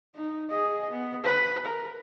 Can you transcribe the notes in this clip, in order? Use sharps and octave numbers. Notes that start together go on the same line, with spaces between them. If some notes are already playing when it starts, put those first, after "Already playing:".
D#4
G#4 D#5
B3
B4
A#4